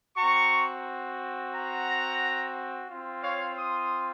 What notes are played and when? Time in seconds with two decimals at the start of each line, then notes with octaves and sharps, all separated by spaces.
0.16 C4 F#4 A#5 C#6
1.53 F#5 A#5
2.88 C4 F4
3.23 C#5 F5
3.57 C6 D#6